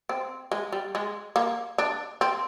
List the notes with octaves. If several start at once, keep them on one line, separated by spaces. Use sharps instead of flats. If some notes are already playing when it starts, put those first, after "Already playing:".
C4
G#3
G3
G#3
A#3
D4
C4